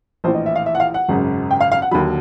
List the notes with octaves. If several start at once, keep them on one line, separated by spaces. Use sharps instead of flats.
A#1 A2 E3 C5
D#5
E5
F5
E5
F#5
F5
F#5
G#1 F#2 C#3
G5
F5
F5
F#5
D#2 D3 F#3 B5